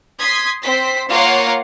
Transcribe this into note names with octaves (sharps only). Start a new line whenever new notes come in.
C6 D#6 G#6 B6
C4 C5 B6
A#3 F4 A#4 C#5 F5 F#5